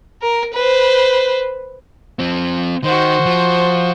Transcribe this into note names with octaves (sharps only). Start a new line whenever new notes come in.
A#4
B4 C5
F3 C4
D#3 F#4 C5
F3